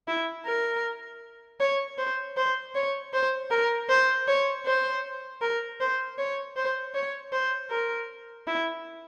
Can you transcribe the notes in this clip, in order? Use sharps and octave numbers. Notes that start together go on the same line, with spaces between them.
E4
A#4
C#5
C5
C5
C#5
C5
A#4
C5
C#5
C5
A#4
C5
C#5
C5
C#5
C5
A#4
E4